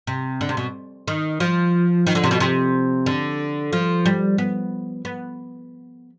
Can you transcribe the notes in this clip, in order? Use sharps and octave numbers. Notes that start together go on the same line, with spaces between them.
C3
D3
C3
B2
D#3
F3
D#3
D3
C3
B2
C3
D3
F3
G3
B3
B3